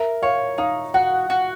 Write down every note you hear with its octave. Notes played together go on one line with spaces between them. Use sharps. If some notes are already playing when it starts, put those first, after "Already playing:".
Already playing: A#4 E5
C#5 F5
D#4 F5
F#4 F#5
F#4